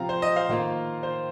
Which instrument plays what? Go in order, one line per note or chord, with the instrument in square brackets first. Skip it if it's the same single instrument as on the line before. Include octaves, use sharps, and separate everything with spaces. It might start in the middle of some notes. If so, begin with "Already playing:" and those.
Already playing: [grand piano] C3 F3 C4 F4 F5 A#5
C5
D#5
C5 F5
D#3 A#3 F4
C5